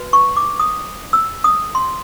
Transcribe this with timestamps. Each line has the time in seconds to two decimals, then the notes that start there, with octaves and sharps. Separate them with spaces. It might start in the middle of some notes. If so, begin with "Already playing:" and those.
Already playing: F#4 B4
0.13 C#6
0.37 D6
0.60 D#6
1.13 E6
1.44 D#6
1.75 C6